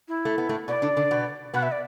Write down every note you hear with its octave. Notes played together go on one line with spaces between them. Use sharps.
E4
A3
B3
A2 A3
B2 B3 D5
D3 D4
D3 D4
B2 B3
B2 B3 F#5
E5
D5